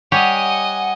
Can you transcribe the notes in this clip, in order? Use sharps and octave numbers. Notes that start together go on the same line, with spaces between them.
G3 G4 C#5 D#5 F#5 G#5